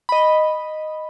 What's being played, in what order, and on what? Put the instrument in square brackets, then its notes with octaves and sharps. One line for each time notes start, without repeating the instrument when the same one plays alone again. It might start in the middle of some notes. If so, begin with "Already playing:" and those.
[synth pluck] D#5 B5